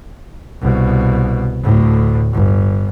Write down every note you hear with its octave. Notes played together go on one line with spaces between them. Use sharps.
C2 B2
D2 A2
G1